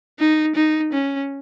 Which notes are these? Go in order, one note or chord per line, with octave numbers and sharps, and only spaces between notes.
D#4
D#4
C#4